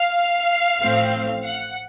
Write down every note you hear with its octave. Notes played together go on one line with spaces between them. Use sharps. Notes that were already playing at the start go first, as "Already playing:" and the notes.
Already playing: F5
A1 A2 F3 A3 C4
F#5